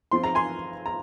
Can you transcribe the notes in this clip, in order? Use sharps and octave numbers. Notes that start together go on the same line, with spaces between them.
F3 C4 F4 C6
A#5
G#5 C6
A#5